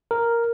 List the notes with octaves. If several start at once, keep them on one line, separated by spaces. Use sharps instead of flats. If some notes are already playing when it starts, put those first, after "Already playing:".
A#4